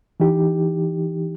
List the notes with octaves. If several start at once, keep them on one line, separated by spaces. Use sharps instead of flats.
E3 D#4 G4